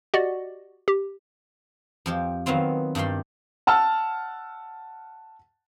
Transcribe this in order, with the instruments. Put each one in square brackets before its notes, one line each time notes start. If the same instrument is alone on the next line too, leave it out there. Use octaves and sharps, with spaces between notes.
[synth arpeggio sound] F#4 G4 D5 D#5 F#5
G4
[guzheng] F2 F3 G4
D#3 F#3 B3 C4 F4
G2 D#3 G3 G4 C6
[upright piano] F#5 A5 E6 F6